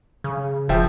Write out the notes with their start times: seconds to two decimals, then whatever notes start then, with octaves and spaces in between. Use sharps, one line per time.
0.24 C#3
0.69 E1 F3 E5 G5